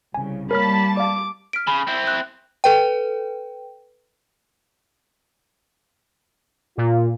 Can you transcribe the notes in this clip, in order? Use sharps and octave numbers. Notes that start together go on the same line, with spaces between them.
C2 C#3 G#5
G3 A#3 A#4 C#5 A5 B5 F6 B6
D5 F5 D6
F6 B6 D7
C#3 B5
C4 E4
F#6
A4 B4 G5
A#2 F4